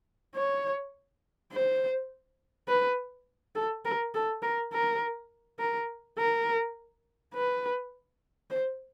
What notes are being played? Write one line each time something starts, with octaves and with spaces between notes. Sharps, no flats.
C#5
C5
B4
A4
A#4
A4
A#4
A#4
A#4
A#4
B4
C5